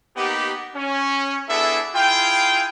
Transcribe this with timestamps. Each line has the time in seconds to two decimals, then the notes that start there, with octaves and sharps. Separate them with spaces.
0.17 A#3 B3 D#4 G4
0.75 C#4
1.48 B3 D4 E4 G#4 A4 E5
1.94 E4 F4 G#4 G5